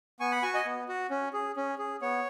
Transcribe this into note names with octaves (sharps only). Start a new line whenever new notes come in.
B3 G#5 C#6
F#5 B5
F#4 G#5 C#6
D#5 G#5
B3
F#4
C#4
G#4
C#4
G#4
B3 C#5